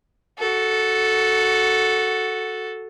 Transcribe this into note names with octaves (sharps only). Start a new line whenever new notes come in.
F#4 A4